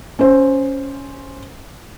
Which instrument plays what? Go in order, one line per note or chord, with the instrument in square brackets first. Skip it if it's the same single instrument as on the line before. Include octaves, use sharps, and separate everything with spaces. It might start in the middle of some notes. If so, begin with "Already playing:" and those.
[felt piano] C#4 C5